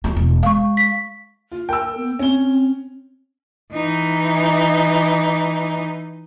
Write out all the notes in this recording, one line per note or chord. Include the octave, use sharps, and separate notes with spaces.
D2 F3
E1
G#3 F5 C#6
B6
F4
A#4 G5 E6
B3
C4 C#4 G7
E3 D#4